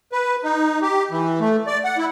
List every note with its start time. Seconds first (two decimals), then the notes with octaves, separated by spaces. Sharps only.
0.12 B4
0.43 D#4
0.82 G4
1.11 E3
1.40 A3
1.67 D5
1.84 F#5
1.98 E4